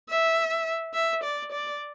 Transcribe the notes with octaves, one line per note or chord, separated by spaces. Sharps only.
E5
E5
D5
D5